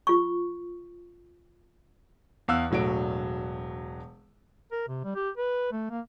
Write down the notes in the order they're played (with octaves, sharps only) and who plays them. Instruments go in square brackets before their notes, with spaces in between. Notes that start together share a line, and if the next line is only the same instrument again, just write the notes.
[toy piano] F4 C#6
[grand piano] E2 F5 E6 F#6
E1 A2 F#3 D4 D7
[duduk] A#4
C3
G3
G4
B4
A3
A#3